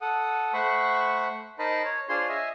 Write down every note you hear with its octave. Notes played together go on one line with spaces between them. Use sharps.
A4 F#5 D#6
A3 C5 F#5 B5 C#6
D#4 A#4 C5 D#5 A5 B5
C#5
D4 F4 G#4 C5 C#5 C6
D#5 E5 G#5